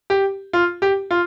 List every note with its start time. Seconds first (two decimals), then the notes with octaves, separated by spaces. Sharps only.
0.10 G4
0.53 F4
0.82 G4
1.11 F4